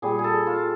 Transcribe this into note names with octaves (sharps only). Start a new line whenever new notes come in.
A#2 G3 G#4
G#4
A4
F4